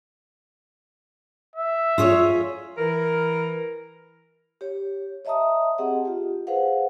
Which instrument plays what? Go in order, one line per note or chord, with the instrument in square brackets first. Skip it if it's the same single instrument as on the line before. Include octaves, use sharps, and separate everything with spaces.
[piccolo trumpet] E5
[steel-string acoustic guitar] F4 G#4 C#5
[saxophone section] E3 A#4
[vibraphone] G4 C#5
C#5 D#5 E5 A5 A#5 D#6
C4 G4 G#4 D#5 F#5
F4 G4
G#4 B4 C5 F5 F#5